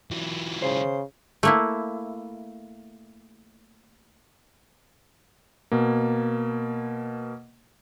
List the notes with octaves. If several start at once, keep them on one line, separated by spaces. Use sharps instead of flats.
E3 F#3
C#3 C5
A3 A#3 E4
B2 A#3